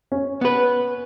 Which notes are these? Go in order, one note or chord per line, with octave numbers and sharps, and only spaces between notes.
C#4
B3 B4